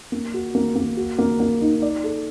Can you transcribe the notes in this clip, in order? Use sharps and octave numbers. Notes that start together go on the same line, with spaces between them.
A#3
F#4
A#3
A#3
F#4
A#3
A#3
D#4
D5
A4